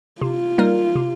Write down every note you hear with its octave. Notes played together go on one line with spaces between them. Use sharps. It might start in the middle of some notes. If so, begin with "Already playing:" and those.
C3 F4
G3 A#3 D#4 A#4
C3